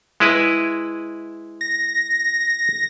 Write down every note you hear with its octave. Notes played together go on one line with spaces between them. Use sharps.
G#3 E4 B4
A#6